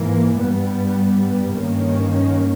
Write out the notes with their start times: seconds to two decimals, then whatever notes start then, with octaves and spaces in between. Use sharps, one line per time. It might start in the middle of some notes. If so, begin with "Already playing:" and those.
Already playing: G#2 E3 A#3
0.37 G2 G3 B3
1.53 G2 D#3 A#3 C#4